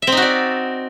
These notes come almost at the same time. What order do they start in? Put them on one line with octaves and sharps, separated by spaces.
E5 C4 D#4 F#4 D5